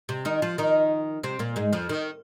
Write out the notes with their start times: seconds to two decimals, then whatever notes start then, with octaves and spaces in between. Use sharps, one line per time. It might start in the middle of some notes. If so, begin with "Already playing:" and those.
0.09 C3
0.25 D#3 D#4
0.42 F3 F4
0.58 D#3 D#4
1.23 C3 C4
1.39 A#2 A#3
1.56 G#2 G#3
1.73 F2 F3
1.89 D#3